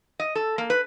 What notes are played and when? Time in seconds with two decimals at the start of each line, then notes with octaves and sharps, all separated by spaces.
0.20 D#5
0.35 A4
0.58 A#3
0.70 B4